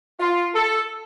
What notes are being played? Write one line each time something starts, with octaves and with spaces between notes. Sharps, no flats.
F4
A4